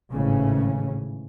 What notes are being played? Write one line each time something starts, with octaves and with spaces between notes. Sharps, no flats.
G#1 A2 C#3 E3 C#4